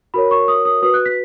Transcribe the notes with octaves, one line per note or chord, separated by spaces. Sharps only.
F#4 A#4 C#5 B5
C#6
D#6
D#6
F#4 B4 D#6
F#6
B6